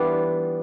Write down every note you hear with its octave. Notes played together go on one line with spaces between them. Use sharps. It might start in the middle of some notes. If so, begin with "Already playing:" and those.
Already playing: E3 G3 B3 D4 F4